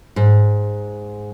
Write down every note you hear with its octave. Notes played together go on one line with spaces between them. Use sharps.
G#2